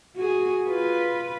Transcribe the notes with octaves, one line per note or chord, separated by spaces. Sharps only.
F#4 G#4
F4 B4